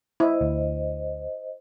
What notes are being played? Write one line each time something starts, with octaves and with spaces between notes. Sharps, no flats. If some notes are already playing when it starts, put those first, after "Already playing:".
E4 C5 D#5
D2